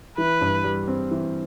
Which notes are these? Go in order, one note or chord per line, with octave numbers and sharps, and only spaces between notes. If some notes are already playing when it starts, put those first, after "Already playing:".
E3 B4
G2
G3
C4
E3